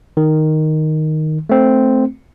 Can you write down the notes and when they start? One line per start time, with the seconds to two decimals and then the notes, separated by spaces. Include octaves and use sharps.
0.17 D#3
1.49 A3 C4